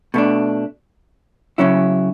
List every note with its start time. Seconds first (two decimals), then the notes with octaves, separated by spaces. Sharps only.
0.14 B2 A3 D4
1.58 C#3 F#3 C#4 E4